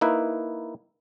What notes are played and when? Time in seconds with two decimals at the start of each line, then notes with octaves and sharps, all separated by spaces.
0.01 A#3 D#4 E4 B4